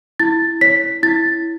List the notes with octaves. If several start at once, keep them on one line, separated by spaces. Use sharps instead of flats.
E4 A6
C#5 B6
E4 A6